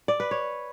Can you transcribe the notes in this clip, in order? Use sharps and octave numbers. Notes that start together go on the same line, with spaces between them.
D5
B4
C#5